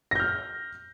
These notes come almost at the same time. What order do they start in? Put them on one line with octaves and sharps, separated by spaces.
A#6 G6 F6